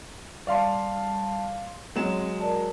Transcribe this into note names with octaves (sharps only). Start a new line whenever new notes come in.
G3 D5 F5 A5 C6
F#3 G#3 C4 E7
A#4 D5 A5